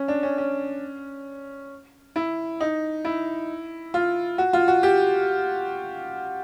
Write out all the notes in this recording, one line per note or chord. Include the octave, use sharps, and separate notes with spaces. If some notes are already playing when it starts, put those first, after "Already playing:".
Already playing: C#4
D4
C#4
C#4
E4
D#4
E4
F4
F#4
F4
F#4
G4